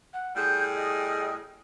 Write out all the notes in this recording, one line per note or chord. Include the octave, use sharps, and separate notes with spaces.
F#5
A2 G3 G#4 G6
D#5